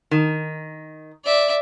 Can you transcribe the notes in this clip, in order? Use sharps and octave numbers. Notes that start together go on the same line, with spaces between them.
D#3
D5 E5